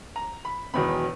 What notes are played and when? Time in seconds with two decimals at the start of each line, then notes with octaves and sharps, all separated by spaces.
0.16 A#5
0.45 B5
0.73 E1 E2 D#3 F#3 B5